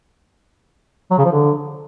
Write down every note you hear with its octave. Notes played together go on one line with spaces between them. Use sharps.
F#3
C#3
F3
D3